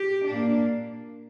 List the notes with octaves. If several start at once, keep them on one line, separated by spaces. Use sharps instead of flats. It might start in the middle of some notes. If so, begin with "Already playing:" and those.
Already playing: G4
A#2 A#3 D4